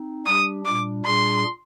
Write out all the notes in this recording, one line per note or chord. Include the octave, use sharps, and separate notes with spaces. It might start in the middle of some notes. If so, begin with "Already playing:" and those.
Already playing: C4 D#4
G3 D4 G4 D#6
A#2 G3 D4 D6
A#2 G3 D4 G#4 C6